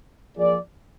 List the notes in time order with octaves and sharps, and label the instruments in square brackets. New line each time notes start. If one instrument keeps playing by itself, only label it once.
[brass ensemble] F3 A#3 F4 G#4 D5